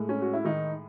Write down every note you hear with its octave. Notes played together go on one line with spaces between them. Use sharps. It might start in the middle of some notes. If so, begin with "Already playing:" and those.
Already playing: A2 G#3
C#4
F#4
E4
D#3 D#4